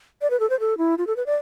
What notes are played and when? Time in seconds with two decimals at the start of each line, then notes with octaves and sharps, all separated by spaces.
0.22 D5
0.30 B4
0.40 A4
0.50 C5
0.60 A4
0.78 E4
0.98 F4
1.07 A4
1.16 B4
1.26 D5